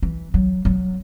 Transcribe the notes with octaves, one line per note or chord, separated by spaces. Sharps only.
E3
F#3
F#3